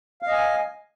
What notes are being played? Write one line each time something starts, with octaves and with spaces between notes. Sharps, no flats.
D#5 F5 G#5